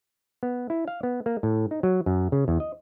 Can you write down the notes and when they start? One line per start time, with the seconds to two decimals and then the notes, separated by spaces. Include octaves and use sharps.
0.43 B3
0.70 E4
0.88 F5
1.03 B3
1.26 A#3
1.43 A2
1.71 D#4
1.83 F#3
2.06 F#2
2.32 C#3
2.48 E2
2.60 D#5